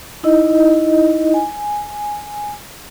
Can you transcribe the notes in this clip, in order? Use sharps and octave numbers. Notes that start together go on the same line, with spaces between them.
D#4 E4 D#5
G#5